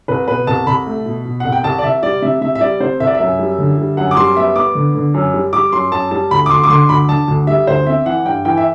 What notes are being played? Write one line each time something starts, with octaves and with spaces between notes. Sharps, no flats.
C2 B4
B2 B4
C2 A5
C2 B5
A3
B2
B2
C2 F#5
G5
C2 A5
D5
C2 E5
G3 D5
C3 E5
C3 E5
E5
G3 D5
C3 C5
C2 E5
D5
E5
F#2
G3
D3
G3
F#2 F#5
D6
G3 C6
B3 E5
B3 D6
D3
D3
F#2
G3
G3 D6
F#2 C6
F#2 A5
G3 A5
D2 B5
D6
D2 C6
D6
D3 C6
D2 B5
D3 A5
D2
G3 E5
D2 C5
C4 E5
E3 F#5
G2 G5
E3 G5
E5